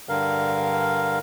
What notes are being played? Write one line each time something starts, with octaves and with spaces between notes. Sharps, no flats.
G2 D3 A#4 F5